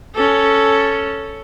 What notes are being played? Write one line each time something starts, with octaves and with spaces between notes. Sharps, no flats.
C#4 A4